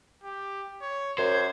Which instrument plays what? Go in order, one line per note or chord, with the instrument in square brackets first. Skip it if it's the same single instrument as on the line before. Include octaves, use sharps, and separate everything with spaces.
[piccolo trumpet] G4
C#5
[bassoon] F#2 [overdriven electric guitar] C5 [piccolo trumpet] G#6